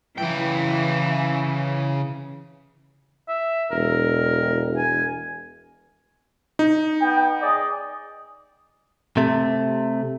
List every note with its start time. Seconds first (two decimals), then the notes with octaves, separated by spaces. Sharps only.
0.18 C#3 E3 G5
3.28 E5
3.71 E1 A#4
4.77 G#5
6.59 D#4
7.01 B3 G5
7.42 G#4 D5 D#5
9.17 C3 A3